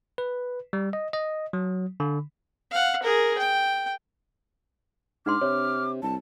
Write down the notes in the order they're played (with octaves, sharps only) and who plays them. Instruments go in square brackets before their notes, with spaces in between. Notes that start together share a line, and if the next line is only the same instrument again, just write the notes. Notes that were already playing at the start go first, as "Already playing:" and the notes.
[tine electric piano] B4
G3
D#5
D#5
F#3
D3
[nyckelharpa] F5 F#5
G#4 A#4
G5
[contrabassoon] G#2 [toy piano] D4 F#5 C6 [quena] D6 [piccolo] F6
[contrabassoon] C3 [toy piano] C#5
[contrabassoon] C2 [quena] A5